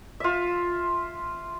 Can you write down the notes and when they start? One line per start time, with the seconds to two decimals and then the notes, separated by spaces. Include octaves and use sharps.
0.20 F4 E5